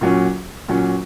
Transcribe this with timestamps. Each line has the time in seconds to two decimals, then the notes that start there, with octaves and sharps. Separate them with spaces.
0.01 A#2 F#3 C#4
0.69 A#2 F#3 C#4